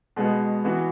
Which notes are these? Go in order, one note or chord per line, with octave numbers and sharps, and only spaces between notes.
B2 G#3 B3 F#4
E3 B3 F#4